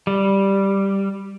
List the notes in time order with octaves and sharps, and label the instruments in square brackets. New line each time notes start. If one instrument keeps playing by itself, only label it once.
[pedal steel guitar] G3